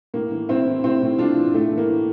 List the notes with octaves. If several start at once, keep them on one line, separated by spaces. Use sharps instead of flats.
A2 A#3
E3
A2 C4 E4
E3
A2 C4 E4
A2
A2 D4 F4
E3
A2 A3
E3
A#3
E3